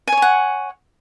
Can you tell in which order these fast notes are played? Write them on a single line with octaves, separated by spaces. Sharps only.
G#5 C#5 C#6 F#5